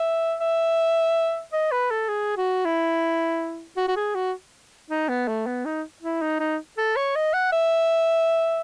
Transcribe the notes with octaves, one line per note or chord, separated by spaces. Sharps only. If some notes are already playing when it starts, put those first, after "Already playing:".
Already playing: E5
E5
D#5
B4
A4
G#4
F#4
E4
F#4
F#4
G#4
F#4
D#4
B3
A3
B3
D#4
E4
D#4
D#4
A4
C#5
D#5
F#5
E5